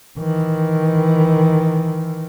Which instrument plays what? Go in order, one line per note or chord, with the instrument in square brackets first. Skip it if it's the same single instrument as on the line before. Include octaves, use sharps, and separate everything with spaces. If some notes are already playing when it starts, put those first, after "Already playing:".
[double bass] D#3 E3